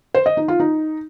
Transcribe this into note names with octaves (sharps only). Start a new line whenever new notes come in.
C5
D#5
D#4
F4
D#4